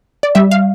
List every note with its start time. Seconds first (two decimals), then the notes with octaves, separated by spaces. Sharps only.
0.23 D5
0.35 G3 E5
0.51 F5